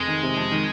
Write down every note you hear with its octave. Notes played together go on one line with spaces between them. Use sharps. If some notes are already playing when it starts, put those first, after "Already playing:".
Already playing: F1 G#3
D#3
C3
F2
D#3